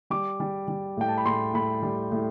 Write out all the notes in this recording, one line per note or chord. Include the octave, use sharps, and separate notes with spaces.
G3 D6
G3
G3
A2 G5
A5
B5
A2 C6
A2 B5
G3
A2